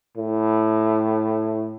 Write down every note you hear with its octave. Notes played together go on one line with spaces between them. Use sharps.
A2